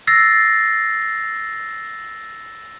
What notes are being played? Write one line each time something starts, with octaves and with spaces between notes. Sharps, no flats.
E6 A6 A#6 C7